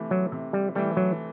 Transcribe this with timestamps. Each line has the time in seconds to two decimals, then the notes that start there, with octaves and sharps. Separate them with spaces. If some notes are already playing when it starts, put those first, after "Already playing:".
Already playing: C3 E3 A3
0.11 F#3
0.32 C3
0.53 G3
0.75 E3 G3 A3
0.97 F#3